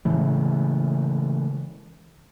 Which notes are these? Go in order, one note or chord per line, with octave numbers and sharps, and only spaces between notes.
A2 C#3 E3 G#3